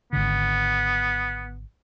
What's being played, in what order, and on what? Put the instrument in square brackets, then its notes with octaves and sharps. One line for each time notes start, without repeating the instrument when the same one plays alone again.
[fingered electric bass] G#1 D3 [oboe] B3